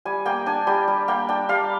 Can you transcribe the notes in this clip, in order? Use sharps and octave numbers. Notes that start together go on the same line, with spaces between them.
G3 G#5
A#3 G5
D4 G#5
G3 G5
G3
A#3 G5
D4 G5
G3 F5